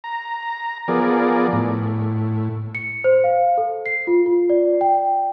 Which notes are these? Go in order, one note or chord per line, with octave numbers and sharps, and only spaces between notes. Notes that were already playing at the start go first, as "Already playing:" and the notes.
A#5
F3 B3 G#4 A#4 D5
A2
C#7
C5
F5
A4
C7
F4
F4
D5
G5